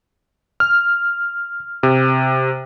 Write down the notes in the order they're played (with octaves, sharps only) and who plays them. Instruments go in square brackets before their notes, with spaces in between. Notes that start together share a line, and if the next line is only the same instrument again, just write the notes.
[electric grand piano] F6
C3